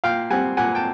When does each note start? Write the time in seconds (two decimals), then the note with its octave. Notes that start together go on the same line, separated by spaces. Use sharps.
0.04 A#2 F5 G5
0.30 G3 C4 F#5 G#5
0.57 A#2 F#5 G#5
0.75 G5 A5